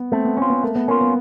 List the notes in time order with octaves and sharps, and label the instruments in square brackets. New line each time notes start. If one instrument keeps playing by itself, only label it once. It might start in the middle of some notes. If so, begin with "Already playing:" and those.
Already playing: [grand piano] B3
[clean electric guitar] A3 [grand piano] C4
[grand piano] B3
[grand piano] C4 [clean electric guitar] C#4
[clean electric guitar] F4
[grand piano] B3
[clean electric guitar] A3 [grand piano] A#3
[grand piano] B3
[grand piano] A#3 [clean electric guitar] C#4
[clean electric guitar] F4
[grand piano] B3